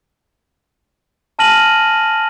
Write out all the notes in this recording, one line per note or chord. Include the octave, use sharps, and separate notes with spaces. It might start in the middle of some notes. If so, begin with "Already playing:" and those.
G#5 A5 F6 A#6 D#7 F#7